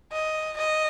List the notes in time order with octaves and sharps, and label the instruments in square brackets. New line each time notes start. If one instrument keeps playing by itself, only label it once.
[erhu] D#5
D#5